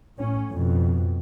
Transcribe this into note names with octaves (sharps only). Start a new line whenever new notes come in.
A2 C#4
F2 B2